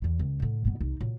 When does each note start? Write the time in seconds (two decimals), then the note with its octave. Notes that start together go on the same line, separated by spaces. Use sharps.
0.02 E2 D3
0.19 C#2
0.40 A2 D3
0.65 G2 B3
0.80 C2 D#4
1.01 A#2 F#3